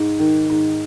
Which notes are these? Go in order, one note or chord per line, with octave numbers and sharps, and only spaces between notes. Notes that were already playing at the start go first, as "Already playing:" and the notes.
Already playing: G#2
D#3
G#2